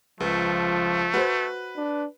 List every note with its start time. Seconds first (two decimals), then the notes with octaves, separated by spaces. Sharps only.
0.20 C#2 F3 A3 B4
1.14 F#4 B4 C5
1.77 D4